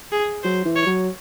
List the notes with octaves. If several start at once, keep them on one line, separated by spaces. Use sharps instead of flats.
G#4
F#3 C5
E3
C#5
F#3